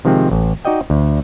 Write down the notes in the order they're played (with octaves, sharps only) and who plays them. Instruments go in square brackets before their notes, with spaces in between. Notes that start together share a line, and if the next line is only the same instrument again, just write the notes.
[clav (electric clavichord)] C3 D#3 F3 G#3 C4
A1
D#4 F#4 D5 D#5 G5
D2